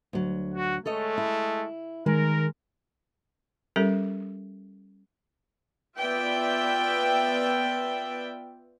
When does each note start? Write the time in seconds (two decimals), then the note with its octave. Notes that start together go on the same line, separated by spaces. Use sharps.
0.13 D2 F#3
0.54 F#4
0.86 G#3 A3 A4 C#5 D#5
1.18 E4
2.06 D#3 G#3 A#4
3.76 G3 C#4 G4 A4 A#4
5.98 B3 F4 B4 D5 E5 G5